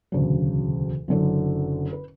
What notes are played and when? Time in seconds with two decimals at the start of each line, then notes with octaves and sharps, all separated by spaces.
0.12 E1 D2 C#3 F#3
1.08 F#1 F#2 D3 F#3
1.93 B4